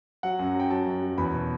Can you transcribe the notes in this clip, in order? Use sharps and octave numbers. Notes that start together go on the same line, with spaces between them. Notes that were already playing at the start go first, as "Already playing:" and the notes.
F#3 F#5
F#2
F#3
G5
F#3 A5
F#2
F#3
E2 B5
B2